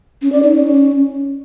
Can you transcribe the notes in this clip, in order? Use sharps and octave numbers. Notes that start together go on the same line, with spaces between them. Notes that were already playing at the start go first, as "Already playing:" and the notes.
C#4
D5
D#4
C#4